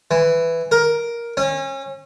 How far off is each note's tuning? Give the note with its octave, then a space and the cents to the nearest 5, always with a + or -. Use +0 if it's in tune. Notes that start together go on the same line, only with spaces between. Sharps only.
E3 +5
A#4 +10
C#4 -30